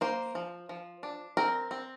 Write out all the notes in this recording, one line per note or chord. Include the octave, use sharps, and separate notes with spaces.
A#3 C5
F3
F3
D4
C4 A#4
C4